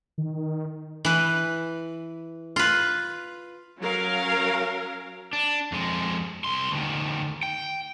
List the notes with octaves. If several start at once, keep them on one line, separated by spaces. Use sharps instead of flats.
D#3
E3 B4
F4 B4
F#3 C#4 A#4 F5
D4
F2 G#3
C2 C6
D2 D#3
G5